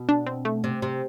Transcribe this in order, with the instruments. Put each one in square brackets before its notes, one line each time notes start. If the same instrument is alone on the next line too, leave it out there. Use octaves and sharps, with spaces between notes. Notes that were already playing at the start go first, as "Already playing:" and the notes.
Already playing: [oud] B2
[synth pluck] D4
C4
A3
[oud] C3
C3